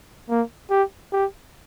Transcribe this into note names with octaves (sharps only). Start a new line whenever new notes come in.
A#3
G4
G4